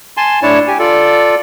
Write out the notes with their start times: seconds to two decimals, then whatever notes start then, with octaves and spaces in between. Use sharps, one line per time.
0.17 G#5 A5 C6
0.42 A2 D4 E4 C#5 A5
0.68 G4 G#5
0.79 F4 A4 D5